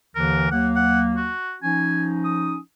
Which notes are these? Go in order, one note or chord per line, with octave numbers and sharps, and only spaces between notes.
D#2 D3 E3 A#4
D#2 F#3 A#3 F#5
F#5
F#4
F3 C#4 D#4 G#5
D#6